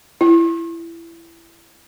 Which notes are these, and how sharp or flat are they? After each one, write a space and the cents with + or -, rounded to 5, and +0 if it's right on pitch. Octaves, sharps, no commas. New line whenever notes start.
E4 +20